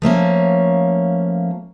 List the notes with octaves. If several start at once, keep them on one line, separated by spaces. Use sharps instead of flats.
F3 A3 A#3 C#4